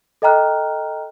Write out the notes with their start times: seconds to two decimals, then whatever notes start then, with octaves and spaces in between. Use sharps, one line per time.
0.22 A4 D#5 G5 A#5 F6 F#6